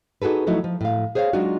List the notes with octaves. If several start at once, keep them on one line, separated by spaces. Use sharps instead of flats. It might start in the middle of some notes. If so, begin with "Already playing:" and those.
D#4 F#4 G#4 A4 B4
F3 F#3 A3 D#4 E4 F#4
F3
A2 F5
G#4 C5 C#5 E5 F5
F#3 G#3 D4 D#4 F4 F#4